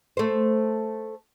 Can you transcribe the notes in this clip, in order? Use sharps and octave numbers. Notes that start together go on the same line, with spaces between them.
A3 C5